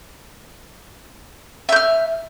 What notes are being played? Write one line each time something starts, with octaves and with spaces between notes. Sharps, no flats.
E5 F6 G6